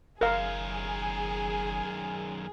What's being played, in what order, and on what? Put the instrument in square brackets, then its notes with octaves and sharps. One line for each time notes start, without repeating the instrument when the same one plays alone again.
[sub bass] F#1 [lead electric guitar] F#2 D#3 [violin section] G#4 [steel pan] A#4 F5